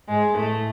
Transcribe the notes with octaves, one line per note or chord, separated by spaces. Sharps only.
G#2 G#3
A2 A3